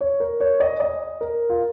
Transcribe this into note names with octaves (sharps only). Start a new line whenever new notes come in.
C#5
A#4
C#5
D#5
D#5
A#4
F4